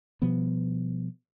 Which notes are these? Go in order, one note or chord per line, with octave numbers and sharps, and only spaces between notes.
B2 F3 G3 B3